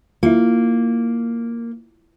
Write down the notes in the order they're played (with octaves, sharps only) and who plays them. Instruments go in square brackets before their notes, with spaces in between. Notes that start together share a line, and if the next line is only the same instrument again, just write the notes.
[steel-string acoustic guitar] A#3 [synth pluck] E4 F4